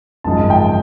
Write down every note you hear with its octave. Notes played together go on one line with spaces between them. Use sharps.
G#1 F#2 C#3 F3 G#3 A5
G5